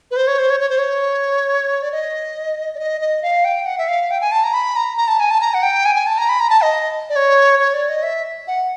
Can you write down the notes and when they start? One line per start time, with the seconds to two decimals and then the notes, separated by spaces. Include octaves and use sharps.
0.11 B4
0.16 C5
0.28 C#5
0.39 C5
0.50 C#5
0.60 C#5
0.70 C5
0.79 C#5
1.82 D5
1.92 D#5
2.75 D5
2.80 D#5
3.01 D#5
3.23 F5
3.45 G5
3.66 F#5
3.78 E5
3.88 F5
4.11 G5
4.21 G#5
4.32 A5
4.44 A#5
4.54 B5
4.76 A#5
4.97 A#5
5.08 A5
5.20 G#5
5.31 A5
5.41 A#5
5.54 F#5
5.63 G5
5.85 G#5
5.95 G#5
6.07 A5
6.18 A#5
6.29 B5
6.40 A#5
6.50 A5
6.62 D#5
7.10 D5
7.16 C#5
7.59 C#5
7.74 D5
7.89 D#5
8.03 E5
8.47 F#5